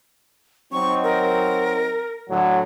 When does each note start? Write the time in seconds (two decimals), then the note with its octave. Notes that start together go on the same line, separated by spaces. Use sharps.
0.72 F#3 C4 D#4 C#6
1.03 A#4
2.29 A2 D3 F#3